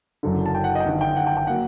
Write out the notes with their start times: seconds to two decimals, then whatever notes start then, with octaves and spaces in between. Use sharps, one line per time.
0.23 F#1 F#2 D3
0.46 A5
0.55 G5
0.64 F#5
0.75 D#5
0.80 G5
0.86 G1 G2 D#3 F#5
1.01 G5
1.16 F#5
1.27 G5
1.37 G5
1.47 F#3 A#3 F#5